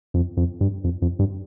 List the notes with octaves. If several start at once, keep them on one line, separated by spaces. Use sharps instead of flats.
F2
F2
G2
F2
F2
G2